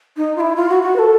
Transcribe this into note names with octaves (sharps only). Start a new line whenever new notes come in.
D#4
F4
E4
F4
F#4
F#4
B4
A4